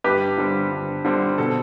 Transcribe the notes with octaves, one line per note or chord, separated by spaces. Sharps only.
G2 G4 B4
D3 G3 C4
G2
D3 G3 C4
B2 A4